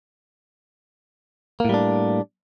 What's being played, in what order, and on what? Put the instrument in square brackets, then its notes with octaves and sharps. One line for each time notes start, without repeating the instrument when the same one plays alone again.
[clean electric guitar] A#3
A2
G3
D4